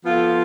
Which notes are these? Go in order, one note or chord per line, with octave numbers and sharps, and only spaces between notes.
F3 B3 F4 A4